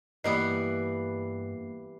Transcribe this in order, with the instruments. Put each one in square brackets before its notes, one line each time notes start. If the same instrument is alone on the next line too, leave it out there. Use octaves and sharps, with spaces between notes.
[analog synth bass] G2 [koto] E3 G3 B3 [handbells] A#3 C7 [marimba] D#5